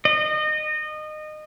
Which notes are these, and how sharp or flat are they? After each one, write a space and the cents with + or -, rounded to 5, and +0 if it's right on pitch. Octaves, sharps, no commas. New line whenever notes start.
D#5 -25